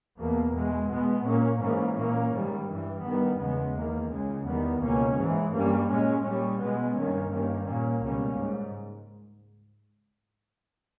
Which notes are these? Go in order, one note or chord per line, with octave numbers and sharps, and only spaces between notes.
E2 B2 A#3
E2 B2 G#3
B2 G#3 B3
A#2 A#3 C#4
G#2 E3 A#3 C#4
A#2 A#3 C#4
G#2 D#3 G3
G2 E3 G3
G2 D#3 G3 B3
E2 C#3 G#3 B3
E2 D#3 A#3
C#2 C#3 G#3
E2 D#3 G3 B3
C#2 B2 A#3 C#4
G#2 E3 G#3
G2 G3 A#3 C#4
A#2 G#3 C#4
A#2 G3 C#4
B2 G#3 B3
G2 D#3 A#3 C#4
G2 D#3 G3 A#3 C#4
A#2 A#3 C#4
C#2 B2 G3 A#3 C#4
G#2